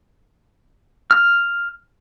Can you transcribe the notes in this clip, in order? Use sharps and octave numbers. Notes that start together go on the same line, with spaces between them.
F6